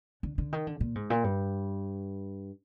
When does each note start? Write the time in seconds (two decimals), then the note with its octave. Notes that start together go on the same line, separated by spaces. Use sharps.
0.23 D3
0.38 D3
0.53 D#3
0.67 D3
0.80 A#2
0.95 G#2
1.10 A#2
1.24 G2